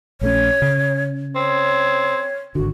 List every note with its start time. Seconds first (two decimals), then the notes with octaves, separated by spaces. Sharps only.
0.21 A#1 A3 C#4 C#5
0.62 C#3
1.36 C4 C#5
2.55 G#1 D3 F#4